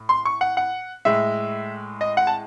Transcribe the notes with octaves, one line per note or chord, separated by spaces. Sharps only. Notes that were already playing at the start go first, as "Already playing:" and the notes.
Already playing: A2
C6
C#6
F#5
F#5
A2 G#3 E5
D#5
F#5
A5